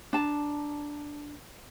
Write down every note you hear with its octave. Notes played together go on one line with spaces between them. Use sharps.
D4 A5 A#5